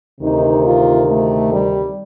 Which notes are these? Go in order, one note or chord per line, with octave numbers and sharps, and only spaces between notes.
D2 C3 D#3 D#4
F4
A3
G3